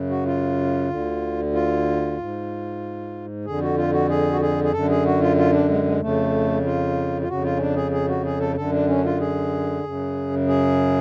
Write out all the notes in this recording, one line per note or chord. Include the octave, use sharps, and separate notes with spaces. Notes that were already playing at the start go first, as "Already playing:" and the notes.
Already playing: F#2 C#3
F#4
F4
D2 D3
F4
G#2
F2 D3 G#4
F#4
F4
F#4
G#4
F#4
G#4
G#4
F#2 D3 A4
G#4
F#4
F4
F4
D4
G#3
G#3
F2 C#3 A3
F4
F4
F2 C#3 F#4
F4
C#4
D4
G#4
G#4
F#4
G#4
A4
F#2 D3 A4
D4
C#4
D4
F4
G#4
F#2 C#3
G#4